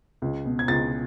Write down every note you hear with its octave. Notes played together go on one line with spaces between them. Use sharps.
C#2
B2
G#6
C#2 A6